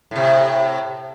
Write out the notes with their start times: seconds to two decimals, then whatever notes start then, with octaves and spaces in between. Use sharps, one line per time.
0.11 A2 C3